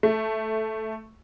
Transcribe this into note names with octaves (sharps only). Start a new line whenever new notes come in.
A3